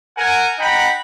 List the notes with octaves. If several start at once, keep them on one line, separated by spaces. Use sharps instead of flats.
A#4 F#5 G#5
D#4 F#5 G5 A#5 B5